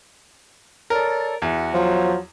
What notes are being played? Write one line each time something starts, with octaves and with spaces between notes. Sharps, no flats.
A4 A#4 C#5 D5
E2 F#4 E5
F3 F#3